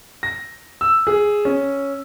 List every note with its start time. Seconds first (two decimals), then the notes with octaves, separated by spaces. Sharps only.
0.23 A#6
0.81 E6
1.07 G#4
1.45 C#4